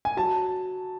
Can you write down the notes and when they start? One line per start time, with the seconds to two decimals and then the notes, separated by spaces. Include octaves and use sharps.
0.05 G#5
0.17 F#3 A5